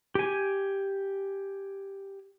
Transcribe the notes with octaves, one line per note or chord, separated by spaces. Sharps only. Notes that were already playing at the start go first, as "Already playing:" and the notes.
G4 G#5